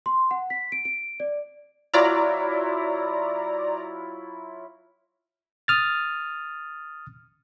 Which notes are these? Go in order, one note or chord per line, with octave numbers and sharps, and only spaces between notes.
C6
F#5
B6
D7
D7
D5
F#3 E4 F4 D5 A#5
D#6 F6 A6